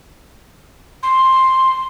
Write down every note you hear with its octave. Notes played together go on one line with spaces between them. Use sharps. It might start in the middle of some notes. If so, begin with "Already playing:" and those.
C6